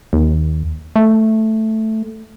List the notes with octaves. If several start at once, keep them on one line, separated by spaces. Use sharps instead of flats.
D#2
A3